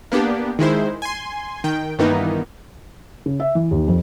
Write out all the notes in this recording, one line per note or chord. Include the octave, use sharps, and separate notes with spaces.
A#3 B3 D4 G4
D#3 G#3 E4 C5
G#5 C6
D#3 G5
G2 D#3 E3 A#3 B3 D#4
C#3
E5
E3
D#2
F2